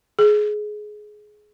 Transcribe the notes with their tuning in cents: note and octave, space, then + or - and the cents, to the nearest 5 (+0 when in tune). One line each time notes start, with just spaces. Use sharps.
G#4 +20